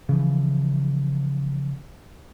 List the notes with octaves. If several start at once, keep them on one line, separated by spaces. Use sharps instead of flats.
C#3 E3 F3